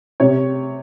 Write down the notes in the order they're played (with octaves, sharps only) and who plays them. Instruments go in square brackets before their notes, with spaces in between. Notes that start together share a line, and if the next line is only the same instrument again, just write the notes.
[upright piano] C3 C#5